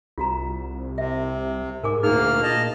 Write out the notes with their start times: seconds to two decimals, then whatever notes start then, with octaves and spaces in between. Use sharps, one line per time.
0.18 C2 F4 F#4 A#5
0.98 C3 E5
1.83 G#2 A#4 G#5 D6
2.03 D2 A#2 A#3 D#4 G#4 A#4 F6
2.43 D#5 G5 A5